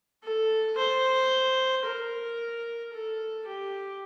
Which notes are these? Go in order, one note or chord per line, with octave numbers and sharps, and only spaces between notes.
A4
C5
A#4
A4
G4